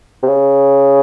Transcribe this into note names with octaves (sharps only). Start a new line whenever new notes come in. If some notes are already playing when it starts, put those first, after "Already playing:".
C3
C#3